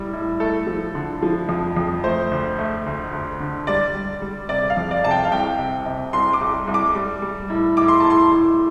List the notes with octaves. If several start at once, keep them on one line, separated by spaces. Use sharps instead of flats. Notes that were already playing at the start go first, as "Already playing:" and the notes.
Already playing: A2 G3
A2
A3 A4
F3
D3
F3
F2
F2
A3 C5
D2
A3
D2
D2
D3
G3 D5
G3
G3
C3 D5
F5
F2
D5
C3 A5
G5
F5
C2 G5
C3
C3
C2 C6
D6
C2
C2
D6
G3
G3
A2
A2 D6
C6
A2 A5
C6
A2